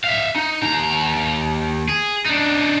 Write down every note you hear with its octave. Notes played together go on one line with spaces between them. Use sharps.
E5 F5
D#4
D#2 A#5
G#4
D4 D#4